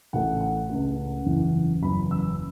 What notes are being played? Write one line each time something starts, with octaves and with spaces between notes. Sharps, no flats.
A1 A2 A3 F#5
F#5
C#2 C#3 A3
F#1 E2 C#3 E3
F#1 E2 C#3 F#3 B5
E6